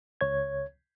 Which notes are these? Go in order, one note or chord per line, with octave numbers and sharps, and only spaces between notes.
C#2 C#5 G#6